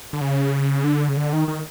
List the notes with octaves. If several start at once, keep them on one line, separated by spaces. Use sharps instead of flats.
D3
C#3
D3
C#3
D3
D#3
D#3